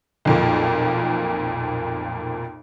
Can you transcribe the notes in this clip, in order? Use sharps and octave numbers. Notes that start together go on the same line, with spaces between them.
B1 F2 A#2